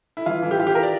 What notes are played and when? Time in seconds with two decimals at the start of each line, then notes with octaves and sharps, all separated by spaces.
0.17 E4
0.26 E3 F4
0.42 E3 E4
0.51 G4
0.59 E3 F4
0.67 G4
0.75 A#4
0.83 D5